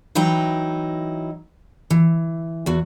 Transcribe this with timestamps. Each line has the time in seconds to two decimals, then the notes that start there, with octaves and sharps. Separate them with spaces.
0.15 E3 F#3 D#4 E4 G5
1.90 E3
2.66 E2 F#4